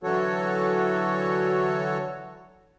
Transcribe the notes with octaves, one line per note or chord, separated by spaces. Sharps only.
D3 E3 F#3 F#4 A4 C#5